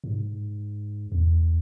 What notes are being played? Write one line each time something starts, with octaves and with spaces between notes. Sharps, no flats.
G#2
E2